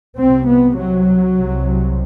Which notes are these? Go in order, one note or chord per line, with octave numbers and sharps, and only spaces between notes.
C2 C3 C4
B3
F#3
C2 C3